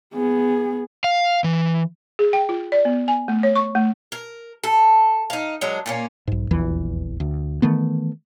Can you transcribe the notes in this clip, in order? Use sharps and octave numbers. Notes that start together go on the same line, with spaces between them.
B3 G#4
F5
E3
G#4
G5
F4
D5
B3
G#5
A3
C#5
C#6
A3
A#4
A4
D#4 F5
F#3 G#3 D4 A#4
A#2 A#3 C#4
B1 G#2
D#1 A#1 E2 E3
D2
D#3 E3 A3 B3